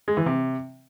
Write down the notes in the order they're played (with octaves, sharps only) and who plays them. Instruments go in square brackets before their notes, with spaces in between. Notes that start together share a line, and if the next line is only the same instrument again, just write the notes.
[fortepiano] G#3
E3
C3